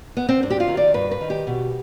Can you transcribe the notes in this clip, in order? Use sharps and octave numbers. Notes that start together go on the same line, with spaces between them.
B3
C4
G2 D4
G4
F4
D#3
D5
G2 B4
B4
D#3
G4
B2